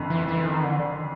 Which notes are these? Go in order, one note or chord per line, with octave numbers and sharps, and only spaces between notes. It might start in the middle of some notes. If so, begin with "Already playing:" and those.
Already playing: F#1 F2 D3
E3
E3
D#3
D3